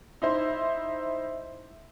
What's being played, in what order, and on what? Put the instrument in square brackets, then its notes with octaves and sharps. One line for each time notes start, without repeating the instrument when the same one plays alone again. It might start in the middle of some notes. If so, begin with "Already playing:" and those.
[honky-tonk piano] D#4 E4 C5